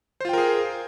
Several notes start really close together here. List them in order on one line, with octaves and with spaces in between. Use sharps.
C5 F4 G5 A#4 G#4